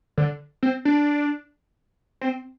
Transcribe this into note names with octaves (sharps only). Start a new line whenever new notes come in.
D3
C4
D4
C4